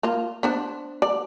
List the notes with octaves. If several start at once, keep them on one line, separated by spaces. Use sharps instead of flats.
A#3 F4
B3 D4 C5
D5